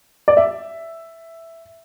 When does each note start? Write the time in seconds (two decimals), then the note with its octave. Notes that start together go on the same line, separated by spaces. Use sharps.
0.28 D5
0.37 E5